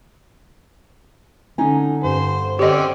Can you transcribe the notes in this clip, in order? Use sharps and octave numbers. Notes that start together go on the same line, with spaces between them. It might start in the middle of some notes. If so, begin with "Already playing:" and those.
D3 C#4 D#4 G#5
G2 C5
D3 C4 C#4 G4 D5 D#5